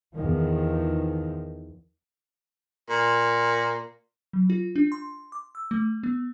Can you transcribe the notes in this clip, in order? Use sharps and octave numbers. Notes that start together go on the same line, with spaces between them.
E2 D#3 F3
A#2
F#3
F4
D4
C6
D6
E6
A3
B3